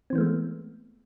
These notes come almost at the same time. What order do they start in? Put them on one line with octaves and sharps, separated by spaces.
C4 E3 B3 A3 G#3